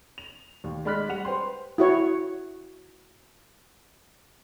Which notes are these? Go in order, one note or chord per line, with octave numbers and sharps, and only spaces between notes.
F7
D#2
G#3 D5 B5 F6 F#6 B6
G3 F#5 F7
B4 C5 G5 C6
E4 F#4 C#5